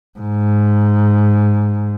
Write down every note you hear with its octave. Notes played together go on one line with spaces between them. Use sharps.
G#2